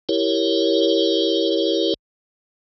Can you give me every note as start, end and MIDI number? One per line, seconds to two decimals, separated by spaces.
0.09 1.94 64
0.09 1.94 67
0.09 1.94 70
0.09 1.94 73